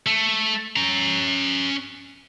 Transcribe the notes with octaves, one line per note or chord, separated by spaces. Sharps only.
A3
C#4 A#5